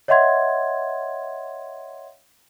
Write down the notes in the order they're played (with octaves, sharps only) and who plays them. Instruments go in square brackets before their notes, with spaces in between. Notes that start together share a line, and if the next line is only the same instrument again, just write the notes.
[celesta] C#5 D#5 E5 F#5 C6 G#6